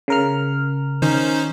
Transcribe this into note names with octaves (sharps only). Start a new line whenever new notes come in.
C#3 A#4 F6
D#3 C#4 D#4 C5